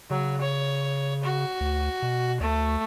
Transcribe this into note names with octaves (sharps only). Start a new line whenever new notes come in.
C#3 F#3
C#5
F#4
D2
B2
D2 A3